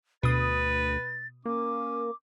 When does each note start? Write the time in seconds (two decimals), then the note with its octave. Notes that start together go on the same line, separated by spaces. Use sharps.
0.23 D2 B2 B4 D#6 A6
1.46 A#3 C#4 D6